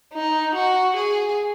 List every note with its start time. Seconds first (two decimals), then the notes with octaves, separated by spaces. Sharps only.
0.14 D#4
0.55 F#4
0.96 G#4